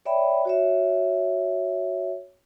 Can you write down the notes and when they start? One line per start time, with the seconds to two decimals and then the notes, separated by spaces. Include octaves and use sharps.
0.05 C#5 D5 E5 G5 B5
0.45 F#4 C#5 E5